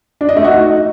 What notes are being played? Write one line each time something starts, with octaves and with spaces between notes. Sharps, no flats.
D4
D#5
A3
F#4
D#4